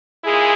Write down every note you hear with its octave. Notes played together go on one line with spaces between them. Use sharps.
A#2 G#3 E4 G#4